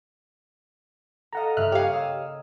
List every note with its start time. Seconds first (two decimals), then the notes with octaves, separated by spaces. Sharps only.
1.33 A4 D#5 F5 F#5 A#5
1.57 G2 C#3 A#3 E5 F6 F#6
1.72 G4 G#4 C#5 F5
1.91 D#5 E6 F6